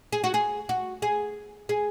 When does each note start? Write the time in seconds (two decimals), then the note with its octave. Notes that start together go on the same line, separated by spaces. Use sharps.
0.12 G#4
0.24 F#4
0.34 G#4
0.69 F#4
1.02 G#4
1.69 G#4